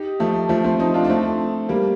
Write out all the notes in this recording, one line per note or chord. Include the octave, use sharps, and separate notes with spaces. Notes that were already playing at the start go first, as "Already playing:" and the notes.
Already playing: D#4 G4
F3 A3
F3 A3
A3 C4
C4 D#4
D4 F4
D4
A3 C4
G3 A#3